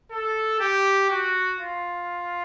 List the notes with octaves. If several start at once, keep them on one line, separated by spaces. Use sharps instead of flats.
A4
G4
F#4
F4